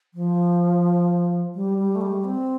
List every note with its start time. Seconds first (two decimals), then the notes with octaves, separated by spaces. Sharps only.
0.14 F3
1.55 G3
1.78 G3
1.95 A3
2.01 G3
2.24 C4